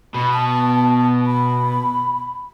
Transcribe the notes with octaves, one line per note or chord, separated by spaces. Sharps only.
B2 B5
A5
B5